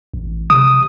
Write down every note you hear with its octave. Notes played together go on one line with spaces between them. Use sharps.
A1
C3 D#6